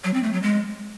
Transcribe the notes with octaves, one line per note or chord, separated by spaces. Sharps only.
F#3
C4
A3
F#3
G#3